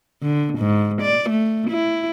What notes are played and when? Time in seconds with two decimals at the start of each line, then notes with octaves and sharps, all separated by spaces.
0.22 D3
0.59 G#2
1.02 D5
1.30 A3
1.70 E4